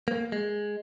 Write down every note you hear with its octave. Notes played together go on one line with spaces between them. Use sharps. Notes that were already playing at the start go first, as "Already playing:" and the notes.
A#3
G#3